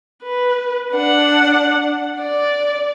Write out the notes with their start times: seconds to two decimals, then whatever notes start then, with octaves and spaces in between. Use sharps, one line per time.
0.23 B4
0.93 D4 F#5
2.20 D5